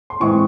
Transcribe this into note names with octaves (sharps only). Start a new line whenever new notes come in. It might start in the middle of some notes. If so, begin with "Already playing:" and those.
C6
A2 E3 G#3 C4 C#6